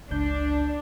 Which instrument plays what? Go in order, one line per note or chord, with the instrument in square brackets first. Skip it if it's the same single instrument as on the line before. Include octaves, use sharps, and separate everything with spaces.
[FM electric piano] G1 C#2 G6 [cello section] D4